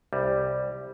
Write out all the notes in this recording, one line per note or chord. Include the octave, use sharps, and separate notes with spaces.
C2 G3